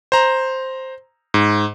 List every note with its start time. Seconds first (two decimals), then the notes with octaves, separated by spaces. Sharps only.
0.12 C5 A#5
1.34 G#2